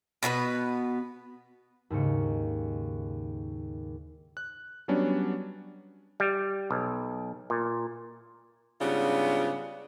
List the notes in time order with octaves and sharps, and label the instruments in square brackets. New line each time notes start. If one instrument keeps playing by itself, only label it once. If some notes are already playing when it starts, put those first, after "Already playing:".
[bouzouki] B2 B3 E4 B4
[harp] D#2 G#2 C#3 C#7
[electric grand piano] F#6
F#3 G3 B3 C#4 D4
[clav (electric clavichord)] G3
B1
A#2
[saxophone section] G#2 C#3 G3 B3 D4 F4